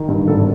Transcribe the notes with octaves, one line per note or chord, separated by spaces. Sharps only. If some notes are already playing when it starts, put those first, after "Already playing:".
Already playing: D#3 A#4
G2
G#1 A4